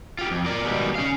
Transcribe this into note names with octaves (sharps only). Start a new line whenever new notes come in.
F4 G4
F2
F4 A#4 D5
B2 D#3 G3 G#3
C#4 F5